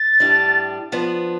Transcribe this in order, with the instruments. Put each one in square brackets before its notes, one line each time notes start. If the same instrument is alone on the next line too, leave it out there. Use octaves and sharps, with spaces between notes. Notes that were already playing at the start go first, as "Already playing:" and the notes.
Already playing: [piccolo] A6
[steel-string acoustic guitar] A2 G3 D4
F3 B3 D4